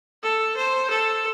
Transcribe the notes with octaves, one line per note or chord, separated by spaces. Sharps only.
A4
C5
A4